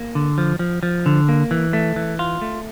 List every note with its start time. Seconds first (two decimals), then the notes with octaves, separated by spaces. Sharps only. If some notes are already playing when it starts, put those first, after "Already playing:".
Already playing: A#3
0.15 D3
0.38 F3
0.59 F3
0.83 F3
1.06 D3
1.29 A#3
1.51 E3
1.73 A3
1.96 E3
2.19 F4
2.42 A3